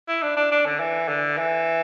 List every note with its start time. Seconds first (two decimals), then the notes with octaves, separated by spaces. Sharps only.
0.08 E4
0.22 D4
0.36 D4
0.51 D4
0.66 D3
0.79 E3
1.09 D3
1.38 E3